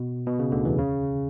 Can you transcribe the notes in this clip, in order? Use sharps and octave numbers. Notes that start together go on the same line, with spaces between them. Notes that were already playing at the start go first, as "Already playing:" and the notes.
Already playing: B2
B2
C#3
D2 D3
E2 E3
C#3